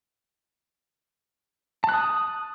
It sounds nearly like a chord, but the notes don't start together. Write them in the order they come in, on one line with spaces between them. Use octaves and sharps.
A5 F#6 D#6